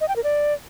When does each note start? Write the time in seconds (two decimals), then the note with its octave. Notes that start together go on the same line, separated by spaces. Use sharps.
0.01 D#5
0.08 G5
0.16 A#4
0.24 D5